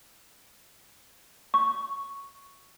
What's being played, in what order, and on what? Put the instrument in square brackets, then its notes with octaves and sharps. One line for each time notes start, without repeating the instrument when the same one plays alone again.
[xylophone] C#6